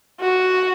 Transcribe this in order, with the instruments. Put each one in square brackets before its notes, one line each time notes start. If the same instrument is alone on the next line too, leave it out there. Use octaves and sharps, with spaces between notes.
[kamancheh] F#4